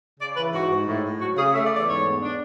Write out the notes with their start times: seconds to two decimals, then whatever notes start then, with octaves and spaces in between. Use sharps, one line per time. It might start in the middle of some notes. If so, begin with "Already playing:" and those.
0.19 C#3 D5
0.36 E3 B4
0.53 G#2 F#4
0.71 G#2
0.87 A2
1.04 A2
1.20 F#3 F#4
1.37 C#3 G#4
1.53 A3 E5
1.65 D5
1.71 E2
1.76 D5
1.87 G#2 C#5
2.04 B3
2.21 D4